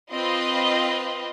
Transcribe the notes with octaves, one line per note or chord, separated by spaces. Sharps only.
C4 F4 B4 D#5